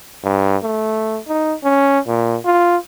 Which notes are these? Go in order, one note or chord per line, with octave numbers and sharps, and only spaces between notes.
G2
A3
D#4
C#4
A#2
F4